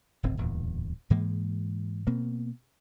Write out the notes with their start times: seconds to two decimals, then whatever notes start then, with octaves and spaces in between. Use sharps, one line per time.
0.23 D1 G#1 C3 C4
0.37 D1 E2 G2 A#2
1.10 G#2 E3 G#3 A#3
2.07 B2 A#3 C4